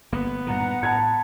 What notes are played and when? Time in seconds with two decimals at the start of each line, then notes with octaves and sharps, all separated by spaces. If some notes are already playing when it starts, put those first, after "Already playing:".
0.12 G1 A#3 B3
0.47 G2 A#2 D#3 F#5 A#5
0.83 A2 A5 B5 G#6